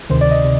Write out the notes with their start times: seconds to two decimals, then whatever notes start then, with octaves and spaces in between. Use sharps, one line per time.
0.10 D2 C3 D#3 C5
0.21 D5
0.31 D#5
0.44 C3